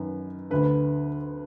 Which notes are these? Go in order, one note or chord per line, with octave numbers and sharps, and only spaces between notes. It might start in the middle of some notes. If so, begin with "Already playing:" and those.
Already playing: F#2 D#3 B4
D2 D3 B4